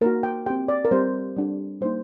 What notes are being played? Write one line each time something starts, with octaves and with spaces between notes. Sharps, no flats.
A#3 D#4 F#4 A#4
G5
C4 G4 G5
D5
A#4
G3 C4 G4 C5
G3 D4 G4
G3 A#3 D#4 C5